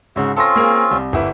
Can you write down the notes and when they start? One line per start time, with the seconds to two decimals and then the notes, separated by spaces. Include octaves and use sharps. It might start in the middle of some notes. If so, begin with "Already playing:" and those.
0.16 G#2 C#3 F#4 E5
0.36 C4 C#4 F4 A4 C6 A#6
0.56 A#3 G#4 A#4
0.91 C2
1.13 G1 A#3 E4 B4